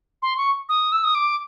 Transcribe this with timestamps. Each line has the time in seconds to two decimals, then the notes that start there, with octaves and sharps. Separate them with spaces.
0.22 C6
0.37 C#6
0.69 D#6
0.92 E6
1.04 D#6
1.15 D6